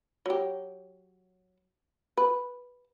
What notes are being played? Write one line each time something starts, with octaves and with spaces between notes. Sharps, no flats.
F#3 G4
B4